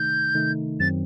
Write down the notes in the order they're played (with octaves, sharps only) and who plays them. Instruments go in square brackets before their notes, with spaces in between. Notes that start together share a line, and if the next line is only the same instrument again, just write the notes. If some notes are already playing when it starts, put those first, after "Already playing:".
Already playing: [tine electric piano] C3 D#3 A3 D#4 [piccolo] G6
[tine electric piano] C3 D#3 A3 D#4
[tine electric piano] F#2 D#3 F#3 C4 [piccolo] A6